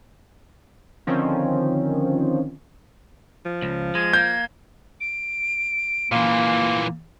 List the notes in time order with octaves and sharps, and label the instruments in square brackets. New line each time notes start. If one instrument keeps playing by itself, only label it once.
[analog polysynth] D3 D#3 F3 C4 C#4
[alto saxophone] F3
[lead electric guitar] C#2
[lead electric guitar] G#3 [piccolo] G#6
[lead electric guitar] A#3 [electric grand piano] G6
[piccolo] D7
[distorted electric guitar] A#2 E3 [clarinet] A#3 [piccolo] C6